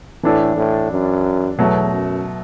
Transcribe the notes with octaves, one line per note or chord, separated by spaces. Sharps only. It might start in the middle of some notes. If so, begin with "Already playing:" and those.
A2 E3 D4 A4
A2
F#2
E2 B2 F#3 A3
F#2